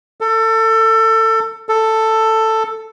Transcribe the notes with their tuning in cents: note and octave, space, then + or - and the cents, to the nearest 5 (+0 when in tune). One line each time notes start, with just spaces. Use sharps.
A4 +25
A4 +10